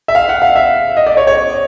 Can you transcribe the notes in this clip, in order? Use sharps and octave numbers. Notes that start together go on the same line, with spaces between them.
E5
F5
F#5
F5
E5
D#5
D5
C#5
C#5